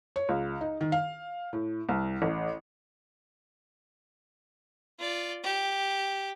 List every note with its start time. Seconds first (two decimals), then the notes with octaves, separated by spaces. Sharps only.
0.16 C#5
0.29 C#2
0.61 D#4
0.81 D#3
0.92 F5
1.53 A2
1.89 C2
2.22 A1
4.99 F4 D5
5.44 G4